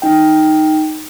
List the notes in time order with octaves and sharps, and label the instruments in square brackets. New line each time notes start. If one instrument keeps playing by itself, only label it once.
[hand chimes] D#4 G5